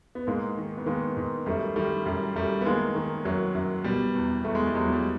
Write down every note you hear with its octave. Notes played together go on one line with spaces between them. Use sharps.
B3
G#2 G#3 A#3
D#3
B3
D#3 G#3 A#3
G#2
F#2 G3 A3
D#3 G3 A3
F#2 G3
F#2 G3 A3
B3
D#3 G#3 A#3
D#3
F#2 F#3
F#2
B2 G3
E2
E2 A3
G#3
G3
E2 F#3 G#3
G3